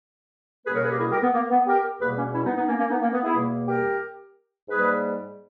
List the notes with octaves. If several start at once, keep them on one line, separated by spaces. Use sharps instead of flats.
C#2 B2 G3 A#3 G#4 B4
A#4 C#5
G#4 B4
G4 A#4
E4 G#4
G4 A#4
B3
A#3
B3
G4 A#4
E2 B2 G3 A#3 G#4 B4
A#3 C#4
C#4 E4
B3 D#4
B3 D#4
A#3 C#4
A#3 C#4
B3 D#4
A#3 C#4
B3
E4 G#4
E2 B2 G3 A#3
G4 A#4
G#2 G3 A#3 G#4 B4